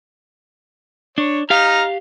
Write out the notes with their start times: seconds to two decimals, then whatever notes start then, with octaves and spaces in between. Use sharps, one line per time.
1.18 D4 C#5
1.50 D#4 G4 F5 A#5 F6